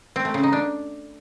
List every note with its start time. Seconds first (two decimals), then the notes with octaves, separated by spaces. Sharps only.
0.16 C4
0.25 A3
0.34 C#3
0.43 D#4
0.53 D4